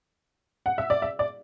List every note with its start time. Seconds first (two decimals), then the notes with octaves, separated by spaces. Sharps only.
0.66 F#5
0.78 E5
0.90 D5
1.02 E5
1.19 D5